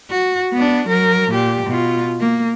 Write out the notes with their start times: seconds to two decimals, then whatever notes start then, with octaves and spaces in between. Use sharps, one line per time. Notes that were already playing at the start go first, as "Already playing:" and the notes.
0.10 F#4
0.54 B3 D4
0.89 F#3 A#4
1.30 A#2 G4
1.67 B2 F4
2.20 A#3